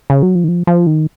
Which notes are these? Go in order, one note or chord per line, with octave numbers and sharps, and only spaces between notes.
C#3
F#3
F3
D#3
F3
F3
D#3